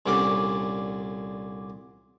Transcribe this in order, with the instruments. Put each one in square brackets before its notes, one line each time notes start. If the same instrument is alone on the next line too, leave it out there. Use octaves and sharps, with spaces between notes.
[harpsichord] C2 A#2 D3 C#4 D4 D5